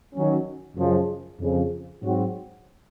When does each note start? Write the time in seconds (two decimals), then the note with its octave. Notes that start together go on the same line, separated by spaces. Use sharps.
0.14 D#3 F#3 C#4
0.77 F#2 C#3 F3 G#3
1.40 F2 C#3 F3
2.02 G#2 F#3 C4 F#4